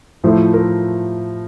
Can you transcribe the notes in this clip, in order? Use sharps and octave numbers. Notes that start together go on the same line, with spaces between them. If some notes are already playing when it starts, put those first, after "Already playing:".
A2 F3 A3 C5
A#4